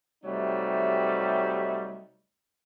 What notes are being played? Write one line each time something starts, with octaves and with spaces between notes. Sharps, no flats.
C3 F#3 G3 A3 D#4